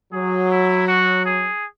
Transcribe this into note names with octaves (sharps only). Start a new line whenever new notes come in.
F#3 G#4
E4
F#4
G#4